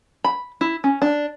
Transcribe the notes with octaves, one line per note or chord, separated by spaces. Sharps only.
B5
E4
C#4
D4